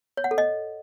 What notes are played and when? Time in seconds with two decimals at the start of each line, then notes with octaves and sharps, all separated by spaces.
0.17 C#5
0.24 F#5
0.31 A4
0.38 D#5